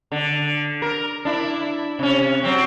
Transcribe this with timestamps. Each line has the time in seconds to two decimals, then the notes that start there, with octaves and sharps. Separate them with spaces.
0.12 D3
0.82 A#4
1.25 D4 E4
1.99 C3 C#4
2.43 F#3 C4